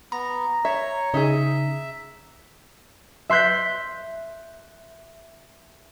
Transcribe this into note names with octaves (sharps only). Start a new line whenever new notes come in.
B3 A#5
C#5 E5
C#3 D#4 G#4 E5
E5 C6 F#6 G6 B6